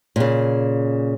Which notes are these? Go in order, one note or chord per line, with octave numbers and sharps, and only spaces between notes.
A#2 C#3